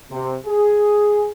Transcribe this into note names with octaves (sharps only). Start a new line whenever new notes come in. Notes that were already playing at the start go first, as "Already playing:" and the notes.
C3
G#4